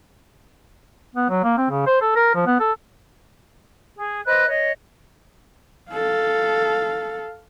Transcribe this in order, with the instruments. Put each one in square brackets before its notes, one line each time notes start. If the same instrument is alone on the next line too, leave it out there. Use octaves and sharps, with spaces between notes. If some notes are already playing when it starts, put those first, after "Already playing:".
[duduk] B3
F#3
A#3
C4
C#3
C5
A4
A#4
F3
B3
A4
[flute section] G#4
B4 C5 D#5 F#6
C#5 D#5
[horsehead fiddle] A4 F5